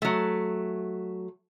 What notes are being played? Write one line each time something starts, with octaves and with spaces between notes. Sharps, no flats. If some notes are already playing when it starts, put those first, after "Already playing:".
F#3 A3